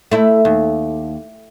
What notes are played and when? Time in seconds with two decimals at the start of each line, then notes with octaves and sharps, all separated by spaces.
0.11 A3 E4
0.45 D#2